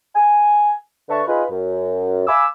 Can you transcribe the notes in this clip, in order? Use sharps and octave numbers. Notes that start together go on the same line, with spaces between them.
G#5
D3 B4 E5 A5 C#6
D#4 F4 G#4 B4
F#2
F5 G#5 B5 D6 E6